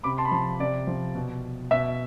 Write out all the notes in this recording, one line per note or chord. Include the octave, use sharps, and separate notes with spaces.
C3 B5 D6
A5 C6
B5
F3 A5 C6
C3 D5
F3
B2
B2 E5